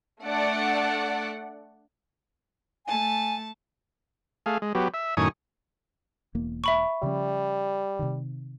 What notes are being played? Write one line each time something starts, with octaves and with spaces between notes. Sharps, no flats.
A3 D4 D5 F#5
A3 G#5 A5
A3 G#4 F5
G#3
F#3 B3 G4
E5
F#2 A2 D#3 G#5 C#6 D#6
E1 E2 A#3
E5 B5 C#6
C#3 F3 G3 C#4
C3 D#3